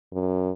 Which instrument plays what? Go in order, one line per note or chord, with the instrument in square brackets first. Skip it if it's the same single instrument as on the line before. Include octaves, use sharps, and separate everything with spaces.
[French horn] F#2